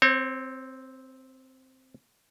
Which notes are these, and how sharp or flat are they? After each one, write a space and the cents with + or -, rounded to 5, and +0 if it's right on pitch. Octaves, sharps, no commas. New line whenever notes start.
C4 +0 C#5 -40